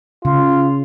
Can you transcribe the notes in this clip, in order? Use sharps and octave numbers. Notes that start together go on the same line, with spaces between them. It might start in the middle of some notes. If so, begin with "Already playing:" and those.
C#3 F4